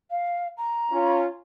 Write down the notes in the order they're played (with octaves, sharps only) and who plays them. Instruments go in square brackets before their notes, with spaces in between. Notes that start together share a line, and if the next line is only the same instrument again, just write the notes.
[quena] F5
A#5
[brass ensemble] C#4 F4